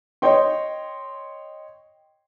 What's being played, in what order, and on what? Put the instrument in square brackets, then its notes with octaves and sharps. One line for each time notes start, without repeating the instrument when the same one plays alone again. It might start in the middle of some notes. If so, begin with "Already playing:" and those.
[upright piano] C#5 D#5 G5 C6